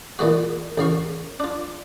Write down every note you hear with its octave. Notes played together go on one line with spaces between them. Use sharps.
A#2 E3 G#3 F#4
A1 C#3 F5 C#6
D4 F4